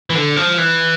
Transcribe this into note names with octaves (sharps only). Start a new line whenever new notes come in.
E3
D3
F3
E3